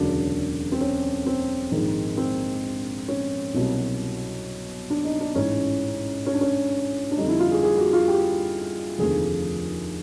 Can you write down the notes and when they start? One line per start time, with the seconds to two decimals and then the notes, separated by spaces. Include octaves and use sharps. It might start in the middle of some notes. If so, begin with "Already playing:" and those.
Already playing: E1 D2 C#3 F#3 D4
0.72 C4
0.81 C#4
1.26 C4
1.72 A#1 G#2 D#3 G#3
2.17 C4
3.08 C#4
3.54 C2 B2 F#3
4.90 D4
5.05 D#4
5.20 D4
5.35 A1 G#2 E3 C#4
6.26 C#4
6.33 D4
6.41 C#4
7.11 D4
7.17 F2 D3 G3 D#4
7.28 E4
7.40 F4
7.51 G#4
7.63 G#4
7.78 F#4
7.93 F4
8.08 G4
8.99 F1 D#2 D3 F3 A3 G#4